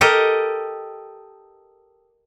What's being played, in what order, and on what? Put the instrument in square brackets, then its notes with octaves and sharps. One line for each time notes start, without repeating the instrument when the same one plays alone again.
[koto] G4 A4 A#4 D#5